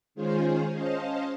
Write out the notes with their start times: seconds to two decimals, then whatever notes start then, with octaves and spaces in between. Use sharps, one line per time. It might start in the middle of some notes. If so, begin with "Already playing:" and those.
0.15 D#3 G#3 C#4 F4 G#4 C5
0.73 C#4 C5 D#5 F5 A5